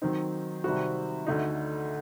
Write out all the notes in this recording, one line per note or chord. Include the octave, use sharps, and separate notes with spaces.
D#3 F#3 C4 D#4
C3 D#3 G3 C4 F#4
D2 D3 A3 D#4